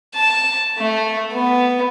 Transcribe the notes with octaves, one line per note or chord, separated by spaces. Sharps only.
A5
A3
B3